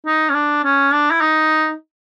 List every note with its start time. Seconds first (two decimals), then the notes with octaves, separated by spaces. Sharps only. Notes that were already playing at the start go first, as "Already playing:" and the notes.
0.06 D#4
0.29 C#4
0.34 D4
0.64 C#4
0.93 D4
1.11 E4
1.21 D#4